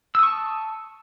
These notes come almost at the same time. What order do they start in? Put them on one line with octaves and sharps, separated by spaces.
E6 D#6 C#6 A5